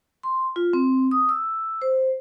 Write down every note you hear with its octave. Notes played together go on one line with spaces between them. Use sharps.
C6
F4
C4
D#6
E6
C5